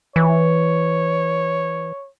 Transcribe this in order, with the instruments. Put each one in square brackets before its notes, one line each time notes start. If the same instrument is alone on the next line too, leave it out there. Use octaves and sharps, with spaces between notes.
[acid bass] E3 [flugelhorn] C#5